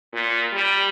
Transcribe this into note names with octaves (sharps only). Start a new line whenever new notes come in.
A#2
G3